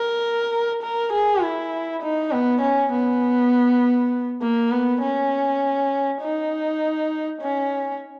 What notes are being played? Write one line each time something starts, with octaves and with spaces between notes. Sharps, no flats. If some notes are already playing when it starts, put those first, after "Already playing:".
Already playing: A#4
A#4
G#4
E4
D#4
B3
C#4
B3
A#3
B3
C#4
D#4
C#4